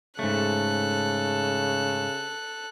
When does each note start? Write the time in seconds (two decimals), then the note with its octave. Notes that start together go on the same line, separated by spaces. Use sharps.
0.19 G#2 C#3 A3 A4 F#6